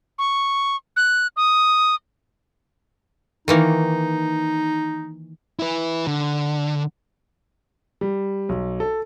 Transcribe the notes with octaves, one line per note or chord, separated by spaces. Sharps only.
C#6
F#6
D#6
D#3 E3 A#3 D#4
E4 B4
D3
G3
B1
A4